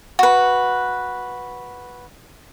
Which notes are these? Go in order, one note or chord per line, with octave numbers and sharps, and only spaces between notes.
F#4 B4